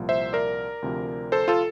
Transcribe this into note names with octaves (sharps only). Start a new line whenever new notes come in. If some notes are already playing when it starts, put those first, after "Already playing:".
Already playing: C2 A#2 F3
C5 E5
A#4 D5
D2 C3 F3
A4 C5
F4 A4